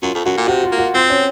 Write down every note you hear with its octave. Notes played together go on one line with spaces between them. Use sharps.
F#2 F4
F2
F#2 F#4
A#2
C3 F#4
F4
A#3
F#4
C4 F4
C#4